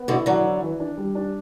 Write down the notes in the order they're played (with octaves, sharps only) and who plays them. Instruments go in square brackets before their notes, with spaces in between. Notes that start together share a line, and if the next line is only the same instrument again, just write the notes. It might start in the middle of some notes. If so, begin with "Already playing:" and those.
Already playing: [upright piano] B3
[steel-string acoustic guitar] B2 D3 [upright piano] E4
[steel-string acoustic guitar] D3 F#3 [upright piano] E3
[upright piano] E4
E3
D4
G3
D4